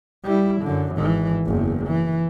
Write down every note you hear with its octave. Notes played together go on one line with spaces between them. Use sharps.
G3 E4
F#2 D3
G#1 E3
F#1 E2
E3